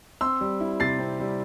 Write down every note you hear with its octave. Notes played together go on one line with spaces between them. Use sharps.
C4 C6 E6
G3
E4
C3 A6 C7
C4
G3